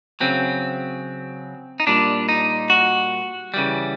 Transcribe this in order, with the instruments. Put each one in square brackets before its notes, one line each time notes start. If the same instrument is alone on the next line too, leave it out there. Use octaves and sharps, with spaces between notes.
[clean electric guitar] C#3 F#3 C4
D#4
A#2 G3 D4
D#4
F#4
C#3 E3 G3